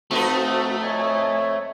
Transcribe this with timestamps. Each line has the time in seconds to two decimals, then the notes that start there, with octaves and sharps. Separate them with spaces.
0.11 F2 A3 C4 D#4 F#4 A4 B4
0.83 C#5 D#5 G#5